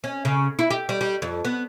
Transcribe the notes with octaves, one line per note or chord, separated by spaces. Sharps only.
C#4
C#3
E4
G4
G3
G3
F2
B3